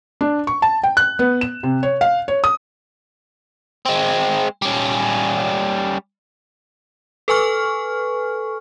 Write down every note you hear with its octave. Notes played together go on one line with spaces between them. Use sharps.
D4
C#6
A5
G5
F#6
B3
E7
C3
C#5
F5
C#5
D#6
G#3 C4
G3 C#4
A4 B4 G#5 C#6 F6